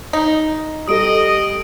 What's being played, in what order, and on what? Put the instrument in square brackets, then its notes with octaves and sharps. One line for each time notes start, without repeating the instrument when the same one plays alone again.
[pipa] D#4
[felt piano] G3 A4 [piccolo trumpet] D#5 [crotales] D#6 D7